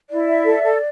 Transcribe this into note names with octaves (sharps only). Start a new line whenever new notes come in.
E4 D5
E5
A4
A4